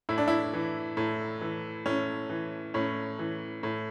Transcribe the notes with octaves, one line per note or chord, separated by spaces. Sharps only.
A2 E4
D4
E4
E3
A2
E3
A2 C#4
E3
A2 C#4
E3
A2